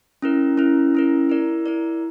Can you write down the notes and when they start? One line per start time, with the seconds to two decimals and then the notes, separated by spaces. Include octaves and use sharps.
0.22 C#4 E4 A#4
0.57 C#4 E4 A#4
0.95 C#4 E4 A#4
1.29 E4 A#4 D5
1.66 E4 A#4 D5